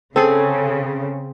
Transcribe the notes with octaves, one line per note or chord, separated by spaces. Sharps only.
C#3 C4 G#4 A4